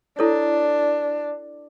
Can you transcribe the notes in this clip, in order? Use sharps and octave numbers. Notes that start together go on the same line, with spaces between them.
D4 E4 A4 C#5